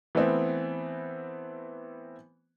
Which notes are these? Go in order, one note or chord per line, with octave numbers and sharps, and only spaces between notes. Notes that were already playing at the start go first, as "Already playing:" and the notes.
E3 A3 B3 C4